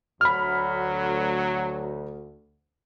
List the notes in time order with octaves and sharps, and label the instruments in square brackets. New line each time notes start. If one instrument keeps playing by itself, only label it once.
[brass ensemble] D2 [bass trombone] F#3 [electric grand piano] B5 F6